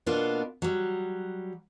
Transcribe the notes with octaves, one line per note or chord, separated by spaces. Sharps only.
B2 A#3 B3 D4 F4
F#3 G3